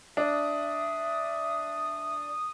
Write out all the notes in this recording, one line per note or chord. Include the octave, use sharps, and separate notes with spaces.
D4 E5 D#6